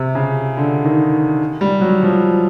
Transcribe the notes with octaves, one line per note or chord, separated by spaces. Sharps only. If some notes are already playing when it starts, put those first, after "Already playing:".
Already playing: C3
C#3
D3
D#3
G3
F#3
F3